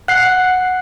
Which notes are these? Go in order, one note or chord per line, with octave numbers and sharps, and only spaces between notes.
F#5 F#6 C7